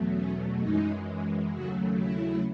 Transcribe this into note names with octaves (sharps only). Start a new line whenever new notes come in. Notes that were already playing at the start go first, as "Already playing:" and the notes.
Already playing: E2 B2 F#3 A3
C#4
F#2 E3 G#3 D#4
D#2 C#3 F#3 A3 F#4
E4